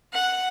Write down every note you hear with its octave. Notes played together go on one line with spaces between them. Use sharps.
F#5